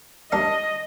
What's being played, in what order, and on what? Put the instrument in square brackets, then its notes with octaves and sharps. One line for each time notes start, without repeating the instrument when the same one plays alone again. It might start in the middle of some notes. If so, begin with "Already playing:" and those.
[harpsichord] G3 D4 G4 A#4 [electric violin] D#5